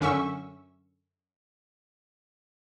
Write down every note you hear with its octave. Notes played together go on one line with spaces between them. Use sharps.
F#2 D3 C#4 E5 C#6 E6